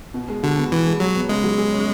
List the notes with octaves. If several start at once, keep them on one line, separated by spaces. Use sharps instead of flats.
B2
G#3
D3 F#4
B3
B2 E3
G#3
F#3 F#4
B3
C#3 G#3
F#3
G#4
C#4